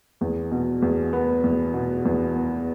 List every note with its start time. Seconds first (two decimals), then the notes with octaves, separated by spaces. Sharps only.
0.21 E2
0.51 B2
0.82 E2
1.13 B3
1.44 E2
1.74 B2
2.05 E2
2.35 B3